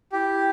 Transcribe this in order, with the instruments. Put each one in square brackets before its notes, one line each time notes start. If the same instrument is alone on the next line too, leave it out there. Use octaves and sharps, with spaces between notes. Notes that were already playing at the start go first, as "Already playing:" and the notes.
[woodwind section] E4 [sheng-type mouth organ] G4